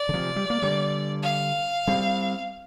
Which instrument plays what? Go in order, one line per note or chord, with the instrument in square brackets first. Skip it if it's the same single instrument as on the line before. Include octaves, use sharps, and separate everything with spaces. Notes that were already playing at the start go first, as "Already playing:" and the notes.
Already playing: [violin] D5
[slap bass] D3
C3 F3
G3
A#3
D3 G3
[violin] F5
[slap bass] G3 C4